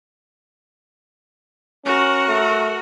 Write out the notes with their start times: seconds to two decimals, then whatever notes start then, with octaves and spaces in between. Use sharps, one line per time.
1.85 C#4 F#4 A#4
2.28 A3